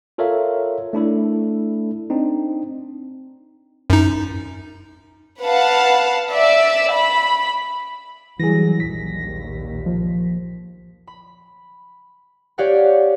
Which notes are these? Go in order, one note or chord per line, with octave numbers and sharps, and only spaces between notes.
F4 A4 A#4 C#5 E5 F5
A3 D4 E4 A4
C4 D4 D#4
F#2 D#4
B4 F5 F#5 A5
D5 E5
B5
E3 F#3 G3 G#4 A#6
A#1 D#2 B6
F3
B5
G4 C#5 D5 F5 F#5 F#6